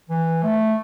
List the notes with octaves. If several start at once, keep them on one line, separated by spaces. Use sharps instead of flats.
E3
A3